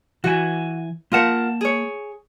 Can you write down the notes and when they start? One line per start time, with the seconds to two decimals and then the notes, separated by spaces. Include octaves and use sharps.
0.24 E3 F#4 G#5
1.12 A#3 F4 A#4 F#5 A5
1.61 G#4 C#5